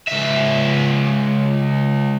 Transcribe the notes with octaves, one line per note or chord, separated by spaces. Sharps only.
C#2 E5